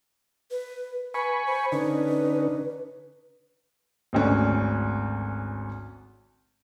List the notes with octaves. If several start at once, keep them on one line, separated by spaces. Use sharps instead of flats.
B4
B4 G#5 B5 C#6
C5
D3 C#4 D#4 B4
G#1 D2 C#4